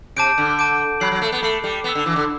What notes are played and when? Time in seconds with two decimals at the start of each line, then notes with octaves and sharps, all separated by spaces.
0.16 C3 A5 D6 G6 D7
0.38 D3
0.59 A5 D6 G6 D7
1.00 F#3 B5 F#6 C7 F#7
1.12 F#3
1.22 A3
1.32 B3
1.42 A3 B5 F#6 C7 F#7
1.64 G3
1.84 B3 E6 B6 E7 G7
1.95 D3
2.06 E3
2.16 D3